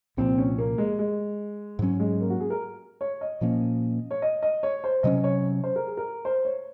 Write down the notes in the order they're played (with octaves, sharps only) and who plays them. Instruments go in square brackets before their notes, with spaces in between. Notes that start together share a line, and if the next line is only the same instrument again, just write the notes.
[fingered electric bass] C2 A#2 F3 [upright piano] C4
[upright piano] C#4
A#3
G#3
G#3
[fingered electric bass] G#2 F#3 C#4
[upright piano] G#3
A#3
F#4
G#4
A#4
C#5
D#5
[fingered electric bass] A#2 F3 A#3 C#4
[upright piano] C#5
D#5
D#5
C#5
C5
[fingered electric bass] C3 F#3 C#4 [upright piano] D#5
[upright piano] C#5
C5
A#4
G#4
A#4
C5
C#5